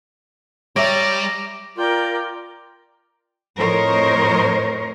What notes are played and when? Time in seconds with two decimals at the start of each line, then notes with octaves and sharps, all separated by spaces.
0.76 G3 C#5 D5 E5 A#5 D6 A#6 D7
1.77 F4 A#4 D5 G5
3.58 F2 A2 A#4 C5 C#5 D#5